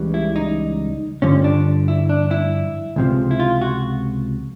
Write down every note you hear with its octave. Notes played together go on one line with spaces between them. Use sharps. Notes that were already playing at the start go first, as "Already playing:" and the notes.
Already playing: C#2 C#3 E3 G3
E4
D#4
G2 D3 F3 C#4
D4
E4
D4
E4
C#2 C3 F3
E4
F4
F#4